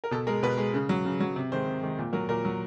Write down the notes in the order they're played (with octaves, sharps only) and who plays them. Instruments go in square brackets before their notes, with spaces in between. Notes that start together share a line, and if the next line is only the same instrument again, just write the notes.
[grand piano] A#4
B2 A4
G#3 A#4
B2 B4
G#3
C#3
F#3
C#3
F#3
C3
D#3 G#3 C5
C3
D#3 G#3
A#2
F#3 A#4
A#2 A#4
F#3